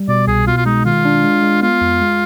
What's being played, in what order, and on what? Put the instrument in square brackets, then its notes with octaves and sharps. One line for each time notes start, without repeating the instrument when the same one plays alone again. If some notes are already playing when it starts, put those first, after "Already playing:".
Already playing: [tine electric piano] G3
[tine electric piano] B2 [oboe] D5
[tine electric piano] C2 [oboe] G#4
[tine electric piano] B2 [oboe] F4
[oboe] F4
[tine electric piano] G#3 [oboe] D#4
[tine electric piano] D#3 [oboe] F4
[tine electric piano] D4
G#3
G#3
[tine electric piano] B3 [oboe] F4
[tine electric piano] F2
G#3